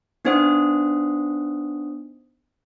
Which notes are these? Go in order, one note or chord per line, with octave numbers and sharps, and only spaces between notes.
B3 D4 D#4 C5 F#5 D#6